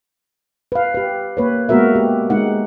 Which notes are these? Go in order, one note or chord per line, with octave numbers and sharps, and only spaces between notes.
B4 F5
G4 B4
A#3 B4 C#5
G#3 A#3 B3 F#4 A#4 E5
G4
G#3 D#4 F#5